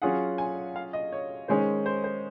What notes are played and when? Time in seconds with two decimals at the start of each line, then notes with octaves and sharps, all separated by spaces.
0.02 F#3 C#4 F4 G#4 F#5
0.38 G#5
0.76 F5
0.93 D#5
1.12 C#5
1.48 D#3 G#3 C#4 G#4 C5
1.86 C5
2.04 C5